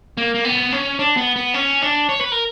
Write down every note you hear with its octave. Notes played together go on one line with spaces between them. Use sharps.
A#3
A#3
B3
C#4
D4
B3
B3
C#4
D4
C#5
B4
A#4